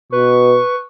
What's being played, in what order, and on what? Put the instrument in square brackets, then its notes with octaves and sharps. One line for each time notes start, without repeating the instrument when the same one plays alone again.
[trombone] B2 [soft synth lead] B4 [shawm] C#6